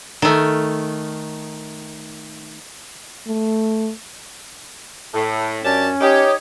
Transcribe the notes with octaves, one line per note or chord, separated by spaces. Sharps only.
D#3 A3
A3
A2 A4
F#2 C#4 D4 G4 A5
D#4 G4 C#5 D#6